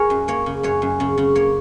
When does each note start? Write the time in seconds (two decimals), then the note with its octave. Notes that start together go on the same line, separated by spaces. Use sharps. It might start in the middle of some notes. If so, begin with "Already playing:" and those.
Already playing: G#4 A#4 C#5
0.10 F#2
0.28 A#3 C#5
0.46 C#3
0.63 F#2 C#5
0.82 F#2
1.00 C#3
1.17 C#3
1.35 A#3 C#5